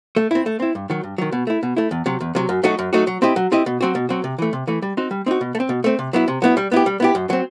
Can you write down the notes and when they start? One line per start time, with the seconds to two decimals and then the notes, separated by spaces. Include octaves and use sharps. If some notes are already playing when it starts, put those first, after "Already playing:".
0.16 A3
0.31 C4 E4
0.46 A3
0.60 C4 E4
0.75 G2
0.90 D#3 F#3
1.03 G2
1.18 D#3 F#3
1.32 B2
1.47 A3 E4
1.63 B2
1.77 A3 E4
1.91 E2
2.06 C3 F#3
2.21 E2
2.35 C3 F#3
2.49 F#2
2.63 F#3 A3 D#4 F#4
2.79 F#2
2.93 F#3 A3 D#4 F#4
3.07 F#3
3.22 C4 E4 G4 D#5
3.36 F#3
3.52 C4 E4 G4 D#5
3.66 B2
3.81 F#3 C4 F#4
3.95 B2
4.09 F#3 C4 F#4
4.24 C3
4.38 E3 A3
4.53 C3
4.67 E3 A3
4.82 G3
4.97 C4 D#4 F#4
5.11 G3
5.26 C4 D#4 F#4
5.41 B2
5.55 A3
5.60 C4
5.69 B2
5.84 A3 C4
5.99 C3
6.13 F#3 B3 E4
6.28 C3
6.42 F#3 B3 E4
6.57 G3
6.72 B3 E4 G4
6.86 G3
7.00 B3 E4 G4
7.15 F#2
7.30 F#3 C4